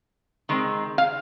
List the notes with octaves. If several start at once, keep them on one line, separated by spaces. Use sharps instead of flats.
D#3 G#3 C4
F5